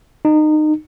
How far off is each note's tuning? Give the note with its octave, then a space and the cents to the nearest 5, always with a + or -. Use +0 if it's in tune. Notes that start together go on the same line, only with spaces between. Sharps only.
D#4 -25